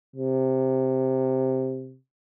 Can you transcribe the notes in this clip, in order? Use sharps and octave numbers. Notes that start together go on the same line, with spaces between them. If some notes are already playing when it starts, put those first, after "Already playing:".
C3